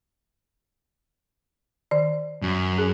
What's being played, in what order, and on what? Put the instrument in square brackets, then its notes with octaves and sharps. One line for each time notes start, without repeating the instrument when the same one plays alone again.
[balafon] D#3 D5
[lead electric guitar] F#2
[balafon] G#4